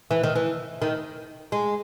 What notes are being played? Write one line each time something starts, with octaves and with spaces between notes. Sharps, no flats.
E3
D#3
E3
D#3
G#3